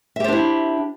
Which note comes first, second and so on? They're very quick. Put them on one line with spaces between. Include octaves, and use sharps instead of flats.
E5 G4 C5 D4 E4